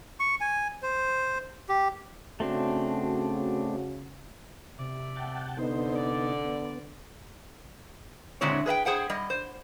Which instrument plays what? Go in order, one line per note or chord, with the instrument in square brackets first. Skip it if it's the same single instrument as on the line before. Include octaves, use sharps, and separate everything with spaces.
[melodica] C#6
G#5
C5
G4
[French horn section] C#3 F#4 [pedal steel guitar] A3 C4 D4
[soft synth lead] C3 [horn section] D5 E5
[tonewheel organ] F#5 G5 A5
[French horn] D3 [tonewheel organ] B3 D#4 [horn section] C5
[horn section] D5
[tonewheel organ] B3
[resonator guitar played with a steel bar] A#2 D3 G#3 C4 E4 C#5
G#4 B4 E5 G5
G#4 C5 F#5 G5
G3 D#5
C5